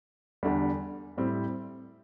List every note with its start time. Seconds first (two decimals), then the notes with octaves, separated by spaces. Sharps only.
0.43 E2 D3 G3
1.17 A2 G3 C4 E4